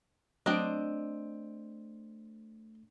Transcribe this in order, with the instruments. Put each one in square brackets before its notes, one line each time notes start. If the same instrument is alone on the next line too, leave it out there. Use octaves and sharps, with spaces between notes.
[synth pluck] F#3 D7 [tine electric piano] A3 [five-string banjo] C4 D#5 [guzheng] D4